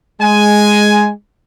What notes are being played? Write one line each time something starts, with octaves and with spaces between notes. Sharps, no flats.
G#3 G#5